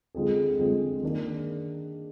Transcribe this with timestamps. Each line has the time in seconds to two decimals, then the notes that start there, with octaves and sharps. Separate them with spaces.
0.14 D3 G#3 C4 F4 G#4
0.59 D3 G#3 C4 F4 G#4
1.03 D#3 A#3 D4